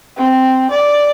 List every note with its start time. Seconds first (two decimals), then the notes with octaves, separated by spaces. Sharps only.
0.18 C4
0.70 D5